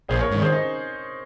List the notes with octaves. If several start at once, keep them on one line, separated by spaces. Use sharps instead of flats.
A#1 G#4 C5
A#4 C#5
G#2 D#3
G#4 C5
D#4